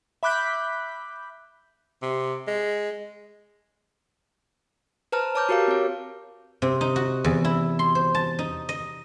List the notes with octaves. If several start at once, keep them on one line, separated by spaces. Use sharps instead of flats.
E5 B5 D6 F#6 G6 B6
C3
G#3
B4 C5 A5 A#5 F6
C#5 A5 A#5 D6 F6 G6
F#4 G4 A#4 F5 D6
C4 C#5
C3
D#4
F#4
E2
E4
C6
C5
A5
D#4
D#5